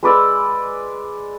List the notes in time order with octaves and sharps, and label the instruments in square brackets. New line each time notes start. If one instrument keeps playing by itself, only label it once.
[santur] G#3 B4 D5 E6